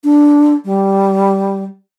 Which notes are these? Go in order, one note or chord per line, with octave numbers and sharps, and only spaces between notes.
D4
G3